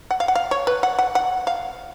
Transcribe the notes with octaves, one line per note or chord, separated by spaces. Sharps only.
F#5
F5
F#5
F5
C#5
B4
F#5
F#5
F#5
F5